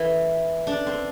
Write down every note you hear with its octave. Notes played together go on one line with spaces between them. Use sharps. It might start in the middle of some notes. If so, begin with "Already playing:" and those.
Already playing: E3
D4
C4